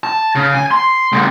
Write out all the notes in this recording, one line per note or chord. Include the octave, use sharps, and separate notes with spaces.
A5
C#3
G#5
C6
C#3 G3